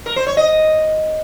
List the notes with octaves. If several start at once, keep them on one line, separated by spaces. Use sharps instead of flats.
A#4
C5
C#5
D#5